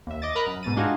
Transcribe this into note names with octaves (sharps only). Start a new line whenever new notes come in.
D#2 E5
D#5 D6 D#6 A6
A#4 D#5 A#5 B5 F#6
F#2
G#2 B2 A6 D#7
G#3 D4 D#4 F4 F#4 G#4